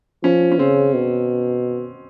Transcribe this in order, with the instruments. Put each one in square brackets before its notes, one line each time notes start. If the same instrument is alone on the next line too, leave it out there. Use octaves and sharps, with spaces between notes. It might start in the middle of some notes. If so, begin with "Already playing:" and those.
[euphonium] F3 [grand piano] C#4
[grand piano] C#4
[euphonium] C#3 [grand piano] C4
[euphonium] B2